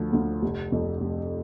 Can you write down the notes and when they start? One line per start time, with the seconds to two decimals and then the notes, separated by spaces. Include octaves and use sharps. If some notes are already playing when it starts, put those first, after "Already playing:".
Already playing: D2 F3
0.13 D2
0.42 F1
0.72 F2
1.01 F1